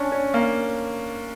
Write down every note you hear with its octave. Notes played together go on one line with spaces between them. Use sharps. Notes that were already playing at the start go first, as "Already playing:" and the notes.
Already playing: C#4 D4
C#4
A#3